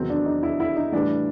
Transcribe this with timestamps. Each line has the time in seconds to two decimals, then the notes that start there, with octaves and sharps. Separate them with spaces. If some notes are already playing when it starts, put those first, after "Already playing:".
Already playing: E2 C3 D#3 F#3 C4
0.10 D4
0.26 D#4
0.43 E4
0.60 E4
0.76 D#4
0.92 A2 E3 G3 D4